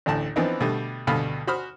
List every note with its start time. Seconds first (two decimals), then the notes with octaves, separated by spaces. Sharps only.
0.06 A1 D2 A2 A5
0.36 E3 F3 B3 C4 D4 D#4
0.61 B2 D3 G3 A3
1.07 D2 G2 B2 A4 F5 B5
1.47 F#4 C5 B5 D#6 F6